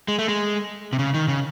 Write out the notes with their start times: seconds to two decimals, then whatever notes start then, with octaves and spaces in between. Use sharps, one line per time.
0.08 G#3
0.19 A3
0.29 G#3
0.93 C3
0.99 C#3
1.14 D#3
1.28 C#3